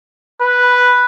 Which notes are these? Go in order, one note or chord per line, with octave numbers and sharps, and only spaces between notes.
B4